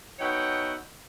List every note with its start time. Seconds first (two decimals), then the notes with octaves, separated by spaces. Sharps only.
0.19 B2 D#4 C#5 E5 F#5 G5